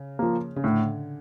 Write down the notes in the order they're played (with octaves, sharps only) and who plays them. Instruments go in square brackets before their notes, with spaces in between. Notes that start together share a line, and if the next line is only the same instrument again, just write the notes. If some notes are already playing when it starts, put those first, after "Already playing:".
Already playing: [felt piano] C#3
[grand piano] F3 A#3
[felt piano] C#3
[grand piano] A2 [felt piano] D3